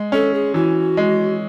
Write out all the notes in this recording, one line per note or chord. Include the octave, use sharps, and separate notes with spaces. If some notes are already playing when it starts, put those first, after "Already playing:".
Already playing: G#3
C#4 A4
G#4
E3 F#4
G#3